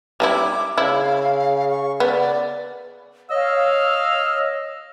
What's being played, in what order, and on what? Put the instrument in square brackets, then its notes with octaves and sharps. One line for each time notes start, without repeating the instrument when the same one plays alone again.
[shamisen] G3 D#4 E4 [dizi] D6
[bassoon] C#3 [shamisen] E4 [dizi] F5
[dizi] C#6
[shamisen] B3 [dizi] D5
[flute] C#5 [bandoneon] D#5 [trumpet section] F5 [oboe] E6